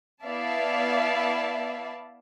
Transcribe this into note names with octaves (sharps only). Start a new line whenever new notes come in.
B3 E4 D5 E5 F5 A5